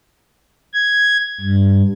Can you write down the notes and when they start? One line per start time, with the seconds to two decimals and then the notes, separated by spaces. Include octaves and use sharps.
0.74 G#6
1.40 G2